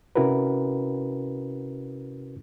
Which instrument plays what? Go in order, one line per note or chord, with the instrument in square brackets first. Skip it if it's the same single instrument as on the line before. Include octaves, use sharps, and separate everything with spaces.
[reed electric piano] C3 C#4 E4 F#4 A#4 B4